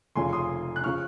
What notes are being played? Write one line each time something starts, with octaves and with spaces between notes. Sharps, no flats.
F1 F2 C#3 F3 G#5 C6
C6 D#6
F#6
C#3 F3 C#6 F6